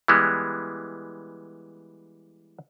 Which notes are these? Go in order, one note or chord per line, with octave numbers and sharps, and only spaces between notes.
E3 G3 G#3 B3